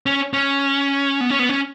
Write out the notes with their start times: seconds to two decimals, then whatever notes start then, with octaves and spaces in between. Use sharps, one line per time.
0.06 C#4
0.33 C#4
1.21 B3
1.30 C#4
1.39 B3
1.49 C#4